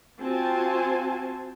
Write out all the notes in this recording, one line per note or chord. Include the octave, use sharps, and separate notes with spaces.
C4 F4 F#4 G#5 A5